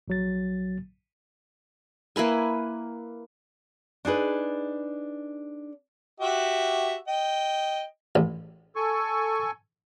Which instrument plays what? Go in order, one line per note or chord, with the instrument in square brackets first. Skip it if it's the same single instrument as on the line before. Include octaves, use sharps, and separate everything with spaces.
[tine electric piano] A#1 F#3 A6
[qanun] A#3 E4 B4 G#5
[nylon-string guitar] D4 D#4 G#4 B4
[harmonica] F#4 G4 E5
D#5 G5
[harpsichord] A1
[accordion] A4 G#5 C#6